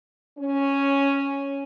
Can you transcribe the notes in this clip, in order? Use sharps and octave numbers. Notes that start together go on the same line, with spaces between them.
C#4